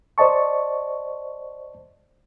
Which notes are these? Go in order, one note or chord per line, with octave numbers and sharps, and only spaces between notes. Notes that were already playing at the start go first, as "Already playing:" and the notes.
C5 D5 D#5 A5 C#6